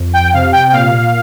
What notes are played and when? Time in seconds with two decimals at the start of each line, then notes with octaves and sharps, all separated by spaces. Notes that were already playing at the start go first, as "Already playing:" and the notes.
Already playing: F2
0.13 G5
0.33 C3 F5
0.53 G5
0.69 G5
0.72 A#2 F5